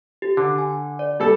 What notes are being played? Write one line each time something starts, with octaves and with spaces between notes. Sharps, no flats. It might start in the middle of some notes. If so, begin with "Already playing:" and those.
G4
D3
G#5
D5
G3 A4